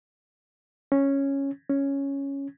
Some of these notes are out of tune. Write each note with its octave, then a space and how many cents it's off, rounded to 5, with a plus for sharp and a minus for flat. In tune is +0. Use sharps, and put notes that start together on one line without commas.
C#4 -5
C#4 +0